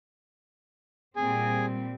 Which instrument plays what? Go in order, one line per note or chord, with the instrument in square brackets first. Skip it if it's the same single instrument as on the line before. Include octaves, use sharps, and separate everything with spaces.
[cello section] A#2 G3 C4 [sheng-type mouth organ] G#4 G#5